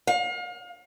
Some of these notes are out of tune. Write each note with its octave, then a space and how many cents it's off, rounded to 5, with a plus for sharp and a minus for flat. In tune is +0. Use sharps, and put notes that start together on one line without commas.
F5 +35